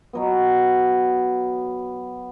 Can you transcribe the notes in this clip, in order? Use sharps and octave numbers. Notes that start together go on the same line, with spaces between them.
B2 F#3 B3